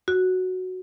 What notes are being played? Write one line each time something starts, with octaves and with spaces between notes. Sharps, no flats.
F#4